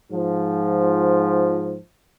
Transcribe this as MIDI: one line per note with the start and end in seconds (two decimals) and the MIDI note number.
0.11 1.77 44
0.11 1.77 53